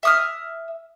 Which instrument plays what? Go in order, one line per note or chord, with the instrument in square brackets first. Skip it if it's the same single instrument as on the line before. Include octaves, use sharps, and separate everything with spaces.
[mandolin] E5 D#6 F6